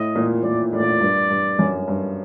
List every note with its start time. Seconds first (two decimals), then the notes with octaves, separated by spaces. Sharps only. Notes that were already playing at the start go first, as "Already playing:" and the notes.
Already playing: A2 D#5
0.15 A#2
0.43 A#2 D5
0.72 A2 D5
0.80 A#2
0.88 A2
1.01 G2
1.30 G2
1.59 F#2
1.88 G2